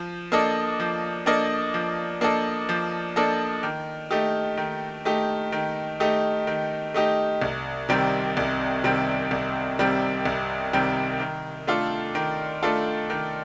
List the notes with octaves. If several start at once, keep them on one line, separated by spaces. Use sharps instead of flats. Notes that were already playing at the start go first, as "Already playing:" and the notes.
Already playing: F3
A#3 D4 A4 D#5
F3
A#3 D4 A4 D#5
F3
A#3 D4 A4 D#5
F3
A#3 D4 A4 D#5
D#3
A3 D#4 G4
D#3
A3 D#4 G4
D#3
A3 D#4 G4
D#3
A3 D#4 G4
C2
C3 D#3 G3 C4
C2
C3 D#3 G3 C4
C2
C3 D#3 G3 C4
C2
C3 D#3 G3 C4
D#3
A3 D4 F4 A4
D#3
A3 D4 F4 A4
D#3